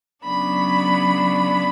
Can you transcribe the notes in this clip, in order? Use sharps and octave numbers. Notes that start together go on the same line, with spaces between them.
C#3 F#3 B3 D4 B5